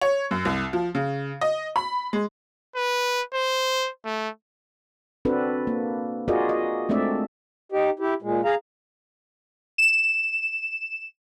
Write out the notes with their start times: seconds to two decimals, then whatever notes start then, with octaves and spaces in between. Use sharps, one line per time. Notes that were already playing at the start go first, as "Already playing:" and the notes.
0.01 C#5
0.31 F#2
0.45 C2
0.73 F3
0.95 C#3
1.41 D#5
1.76 B5
2.13 G#3
2.76 B4
3.34 C5
4.05 A3
5.25 C4 D4 F#4 A4 B4
5.67 A#3
6.28 F4 F#4 G#4 A#4 D5 D#5
6.49 D#5
6.89 G#3 A3 C4 D4 D5 E5
7.72 D#4 G4
7.99 E4 G4
8.22 A#2 G#3
8.45 G#4 F5 A#5
9.78 E7